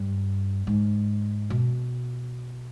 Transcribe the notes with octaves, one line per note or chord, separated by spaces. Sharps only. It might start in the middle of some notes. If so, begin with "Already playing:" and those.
Already playing: G2
G#2
B2